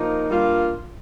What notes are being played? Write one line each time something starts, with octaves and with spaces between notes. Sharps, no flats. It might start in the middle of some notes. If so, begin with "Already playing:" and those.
Already playing: F3 A#3 D#4
G2 G3 A#3 F4